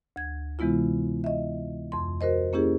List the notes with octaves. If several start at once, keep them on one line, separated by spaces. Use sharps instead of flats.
D2 G#6
C3 E3 G#3 B3 E4 F4
D#5 E5
F2 C6
F#4 A#4 C5 D#5
A#3 C#4 E4 G4 G#4